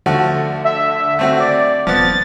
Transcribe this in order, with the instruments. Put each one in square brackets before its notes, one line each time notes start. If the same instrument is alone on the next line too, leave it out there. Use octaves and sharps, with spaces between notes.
[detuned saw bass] D3 [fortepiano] F3 A3 F#4
[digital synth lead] E5
[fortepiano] A3 C4 F#4
[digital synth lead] D5
[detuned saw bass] D#1 [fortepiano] F3 B3 [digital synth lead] A6